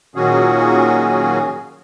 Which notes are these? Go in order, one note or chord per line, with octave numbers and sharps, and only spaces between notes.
A#2 D#3 F#3 C#4 F#4 G#4